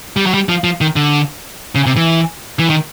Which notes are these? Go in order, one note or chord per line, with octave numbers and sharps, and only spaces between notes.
G3
F#3
G3
F3
F3
D#3
D3
C#3
C3
E3
E3
D#3